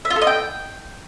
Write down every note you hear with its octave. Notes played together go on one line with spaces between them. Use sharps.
E5
F4
A4
D#5
G5